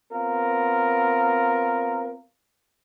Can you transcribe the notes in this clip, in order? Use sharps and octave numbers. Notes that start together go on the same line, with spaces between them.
B3 C4 F4 A#4